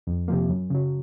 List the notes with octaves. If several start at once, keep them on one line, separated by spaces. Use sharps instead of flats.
F2
C3 F3 A#3
F#2
C#3 F#3